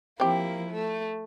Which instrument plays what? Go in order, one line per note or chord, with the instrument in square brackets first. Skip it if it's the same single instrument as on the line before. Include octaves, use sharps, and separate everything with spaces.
[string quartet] F3 A#3 E4 [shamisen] C4 G4
[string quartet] A3